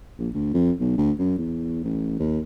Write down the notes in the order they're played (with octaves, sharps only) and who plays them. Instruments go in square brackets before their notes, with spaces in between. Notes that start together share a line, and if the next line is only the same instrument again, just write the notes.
[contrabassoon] A#1
D2
F2
B1
D2
F#2
E2
A1
D#2